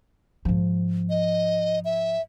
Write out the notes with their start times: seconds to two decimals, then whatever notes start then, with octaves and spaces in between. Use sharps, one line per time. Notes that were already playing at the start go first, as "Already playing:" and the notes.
0.45 G#2 F3
1.10 D#5
1.85 E5